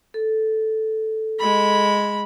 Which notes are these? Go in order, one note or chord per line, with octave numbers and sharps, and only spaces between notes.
A4
G#3 B5